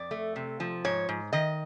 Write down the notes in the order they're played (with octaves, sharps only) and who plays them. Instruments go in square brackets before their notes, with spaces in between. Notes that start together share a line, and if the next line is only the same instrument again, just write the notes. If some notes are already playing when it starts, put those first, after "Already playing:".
Already playing: [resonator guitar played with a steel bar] F2 D5
A3
C3
F3
G#2 C#5
G#2
D#3 D#5